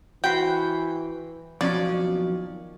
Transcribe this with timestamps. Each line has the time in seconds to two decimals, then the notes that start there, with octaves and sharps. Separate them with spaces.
0.24 E3 F#4 B4 C5 G5
1.61 F2 B2 D#3 F3 F#3 C#4 D5